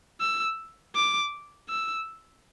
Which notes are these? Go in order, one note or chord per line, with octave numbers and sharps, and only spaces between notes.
E6
D6
E6